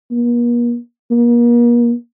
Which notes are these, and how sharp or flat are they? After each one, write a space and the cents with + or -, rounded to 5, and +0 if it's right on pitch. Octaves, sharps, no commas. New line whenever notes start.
A#3 +45
A#3 +40